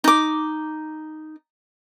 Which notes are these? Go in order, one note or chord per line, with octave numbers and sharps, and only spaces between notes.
D#4 D6